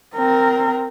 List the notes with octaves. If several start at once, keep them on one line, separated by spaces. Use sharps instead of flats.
C4 A#4